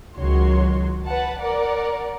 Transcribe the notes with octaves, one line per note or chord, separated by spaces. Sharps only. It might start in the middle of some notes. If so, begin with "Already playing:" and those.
C#2 D#3 F#3 F#4 C#5 C6
B4 F#5 A5
A#4 D5 F#5